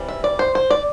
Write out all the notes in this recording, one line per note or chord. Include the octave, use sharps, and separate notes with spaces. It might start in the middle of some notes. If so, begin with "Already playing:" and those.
Already playing: E3 G3 C4
E5
D5
C5
C5
D5